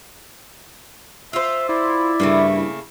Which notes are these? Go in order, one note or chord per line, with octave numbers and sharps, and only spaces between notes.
F4 C5 E5
E4 D5
G2 C#3 A3 A#3